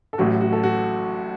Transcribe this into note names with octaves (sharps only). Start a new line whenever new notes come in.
A4
A1 A2 F#3 F#4
F#4
A4
F#4